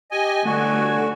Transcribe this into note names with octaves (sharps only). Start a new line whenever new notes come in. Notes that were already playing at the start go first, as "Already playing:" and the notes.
G4 D#5 G#5
G1 F#2 D3 A3 F#4 G#5